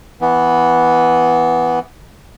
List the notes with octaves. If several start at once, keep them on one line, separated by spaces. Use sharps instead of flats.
E3 B3